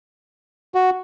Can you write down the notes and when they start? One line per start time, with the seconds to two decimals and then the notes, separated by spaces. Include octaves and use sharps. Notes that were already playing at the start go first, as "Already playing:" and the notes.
0.75 F#4